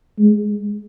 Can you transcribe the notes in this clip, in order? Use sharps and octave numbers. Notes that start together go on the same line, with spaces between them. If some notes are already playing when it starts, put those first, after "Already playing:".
G#3